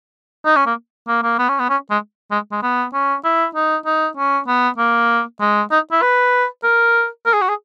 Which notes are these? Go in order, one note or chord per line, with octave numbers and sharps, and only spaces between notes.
D#4
C#4
A#3
A#3
A#3
B3
C#4
B3
C#4
G#3
G#3
G#3
B3
C#4
E4
D#4
D#4
C#4
B3
A#3
G#3
D#4
E4
B4
A#4
A#4
G#4
F#4
G#4